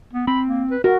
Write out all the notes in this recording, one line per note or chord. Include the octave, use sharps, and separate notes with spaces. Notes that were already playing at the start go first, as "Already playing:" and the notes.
B3
C4 B5
A#3
B4
F#4 A#4